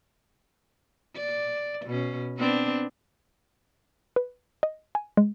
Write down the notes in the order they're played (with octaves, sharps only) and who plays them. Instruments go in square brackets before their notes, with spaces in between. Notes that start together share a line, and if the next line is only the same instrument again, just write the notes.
[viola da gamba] D5
B2 C#4
B3 C4 D4
[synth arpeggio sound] B4
D#5
G#5
G#3